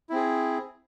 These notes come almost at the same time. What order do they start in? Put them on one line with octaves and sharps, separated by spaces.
E4 C4 G#4